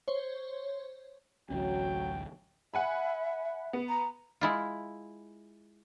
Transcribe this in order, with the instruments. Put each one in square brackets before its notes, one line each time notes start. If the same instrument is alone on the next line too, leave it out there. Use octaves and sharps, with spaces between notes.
[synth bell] C5 C#5
[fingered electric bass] A1 D2 C#4 [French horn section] F#3 [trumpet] G5
[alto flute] E5 [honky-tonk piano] F#5 G#5 B5
[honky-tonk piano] B3
[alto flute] A#5
[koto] G#3 E4 F4